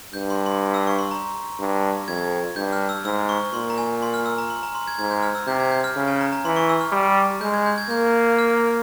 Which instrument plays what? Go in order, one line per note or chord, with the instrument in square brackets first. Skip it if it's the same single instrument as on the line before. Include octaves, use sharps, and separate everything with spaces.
[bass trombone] G2 [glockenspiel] G6
[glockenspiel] C6
C6
E6
C#6
C6
A#5
[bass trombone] G2
[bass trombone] F2 [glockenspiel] G#6
[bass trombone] G2 [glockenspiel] G6
[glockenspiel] F6
E6
[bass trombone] G#2 [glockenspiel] E6
[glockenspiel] C#6
[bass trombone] A#2 [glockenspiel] C6
[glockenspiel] A#5
G#5
C6
F6
E6
A#5
C6
A#5
C6
G#6
[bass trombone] G#2 [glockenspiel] G#6
[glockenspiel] G6
F6
E6
[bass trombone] C3 [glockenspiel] G6
[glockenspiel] G#6
G6
F6
[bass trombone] C#3
[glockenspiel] G#5
A#5
A#5
[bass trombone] E3 [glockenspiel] C6
[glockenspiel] C#6
E6
F6
[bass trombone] G3
[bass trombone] G#3 [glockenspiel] G6
[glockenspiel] G#6
G6
G#6
[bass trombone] A#3 [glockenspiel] G6
[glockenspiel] F6